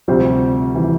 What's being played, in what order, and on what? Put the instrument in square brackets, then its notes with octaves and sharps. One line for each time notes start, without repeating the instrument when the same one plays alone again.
[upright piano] D2 C3 G3 C4 [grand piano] F3
[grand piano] E3